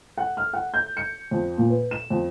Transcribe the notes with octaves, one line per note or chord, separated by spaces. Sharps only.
F#5
F6
F#5
G6
C#7
F2
A#2
B4
E7
F2